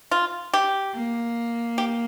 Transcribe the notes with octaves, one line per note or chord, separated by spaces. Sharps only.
F4
G4
A#3
G4